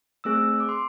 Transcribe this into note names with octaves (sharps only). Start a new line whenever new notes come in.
A3 C4 G#4 E6
D6
C6